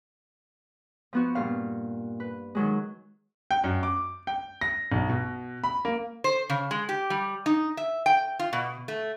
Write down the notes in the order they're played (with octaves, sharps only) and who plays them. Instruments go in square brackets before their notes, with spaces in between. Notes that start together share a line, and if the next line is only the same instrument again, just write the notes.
[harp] F3 B3 F#4
G2 A#2 F5
B4
D#3 F#3 G#3
[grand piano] G5
F#2
D6
G5
A#6
B1
B2
B5
A#3
[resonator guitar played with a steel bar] C5
C#3
G#3
G4
G3
D#4
E5
G5
F4
B2
A3